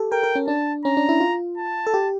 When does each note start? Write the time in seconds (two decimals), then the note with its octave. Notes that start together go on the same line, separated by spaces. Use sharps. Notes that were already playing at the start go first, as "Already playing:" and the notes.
Already playing: G4 A4
0.12 A#4 G5
0.23 A#4
0.35 C#4
0.48 D4 A5
0.85 C#4 A#5
0.97 D4
1.09 E4
1.20 F4
1.57 A5
1.87 A4
1.94 G4